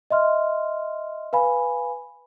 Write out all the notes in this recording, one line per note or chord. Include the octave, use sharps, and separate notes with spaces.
D#5 E5 C6 F6
B4 F5 G#5 B5